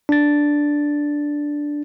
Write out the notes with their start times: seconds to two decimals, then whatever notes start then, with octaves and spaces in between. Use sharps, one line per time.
0.09 D4 A6